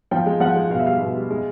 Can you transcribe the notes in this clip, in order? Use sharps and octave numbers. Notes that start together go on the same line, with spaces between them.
F3 G5
G#3
F3 F#5
G#3
B2 F5
E5
G3 F5
B2
G3
G#3